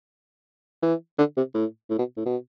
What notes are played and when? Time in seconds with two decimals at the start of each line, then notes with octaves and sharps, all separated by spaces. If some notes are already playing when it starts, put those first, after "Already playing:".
0.83 E3
1.18 D3
1.37 C3
1.54 A2
1.90 A2
1.98 B2
2.17 A2
2.26 B2